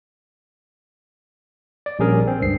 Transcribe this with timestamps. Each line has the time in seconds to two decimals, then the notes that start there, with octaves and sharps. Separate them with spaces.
1.86 D5
1.99 A#1 G3 C#4 G#4 A#4
2.27 C4
2.41 C#2 G2 C7